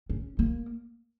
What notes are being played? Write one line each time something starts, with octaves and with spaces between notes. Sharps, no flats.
C#4
A#3